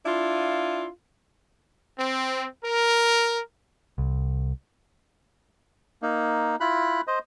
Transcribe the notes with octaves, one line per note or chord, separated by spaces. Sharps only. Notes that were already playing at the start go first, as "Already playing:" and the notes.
D4 E4 F4
C4
A#4
C2
A#3 D#4
E4 F4 B5 F#6
C5 D#5